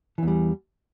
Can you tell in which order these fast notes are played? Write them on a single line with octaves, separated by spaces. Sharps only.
E3 E2 G3